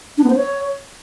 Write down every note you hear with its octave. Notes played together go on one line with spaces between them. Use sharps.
D4
B3
C5
C#5